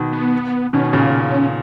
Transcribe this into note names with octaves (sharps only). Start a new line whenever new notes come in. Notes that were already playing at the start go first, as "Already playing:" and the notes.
Already playing: B2 D#3
B3
B2 D#3 C#4
A#2 C#3